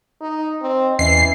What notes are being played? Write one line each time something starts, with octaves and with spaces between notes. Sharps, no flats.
D#4
C4 D#5
E2 E3 C#4 C7